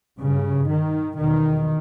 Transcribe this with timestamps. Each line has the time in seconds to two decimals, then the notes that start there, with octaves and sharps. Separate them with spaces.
0.19 G2 C#3
0.70 D#3
1.18 E2 B2 D#3